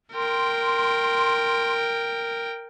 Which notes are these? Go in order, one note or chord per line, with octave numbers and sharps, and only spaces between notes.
A#4 G5 C6